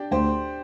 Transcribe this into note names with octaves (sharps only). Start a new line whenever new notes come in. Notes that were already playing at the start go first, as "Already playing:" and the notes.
Already playing: D4 G4 G5
D2 G4 C5